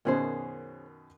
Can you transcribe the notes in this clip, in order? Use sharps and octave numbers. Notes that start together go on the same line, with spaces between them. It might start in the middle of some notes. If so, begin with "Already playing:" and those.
F#2 B2 D#3 C#4 G#4 C5